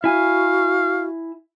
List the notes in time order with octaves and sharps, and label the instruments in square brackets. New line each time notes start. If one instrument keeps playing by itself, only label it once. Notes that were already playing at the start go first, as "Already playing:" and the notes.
[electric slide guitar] E4 G#5 [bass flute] F#4 [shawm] F5